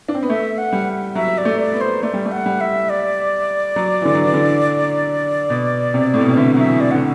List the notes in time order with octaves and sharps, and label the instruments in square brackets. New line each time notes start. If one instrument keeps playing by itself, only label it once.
[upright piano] D4
C4
B3
[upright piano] A3 [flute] E5
[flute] F#5
[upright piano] G3
[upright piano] F#3 [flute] E5
[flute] D5
[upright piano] A3
[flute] D5
[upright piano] B3
[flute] C5
[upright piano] A3 [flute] D5
[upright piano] G3
A3
[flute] F#5
[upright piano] G3
[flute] E5
D5
[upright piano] F#3
E3
D3
F#3
E3
D3
B2
C3
A2
B2
C3
[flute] D5
[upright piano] D3 [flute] E5
[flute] F#5
[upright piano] F#3 [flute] E5
[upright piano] E3
[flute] D5
[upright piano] D3 [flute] F#5